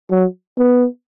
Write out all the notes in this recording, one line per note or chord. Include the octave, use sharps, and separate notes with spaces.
F#3
B3